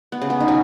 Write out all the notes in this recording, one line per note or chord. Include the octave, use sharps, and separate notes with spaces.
B3
C#3
B3
D#4
F#3 C#4